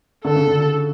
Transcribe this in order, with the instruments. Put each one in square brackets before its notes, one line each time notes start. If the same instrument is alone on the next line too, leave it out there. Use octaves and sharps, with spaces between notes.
[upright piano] D3 [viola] A4
[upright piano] C#3
D3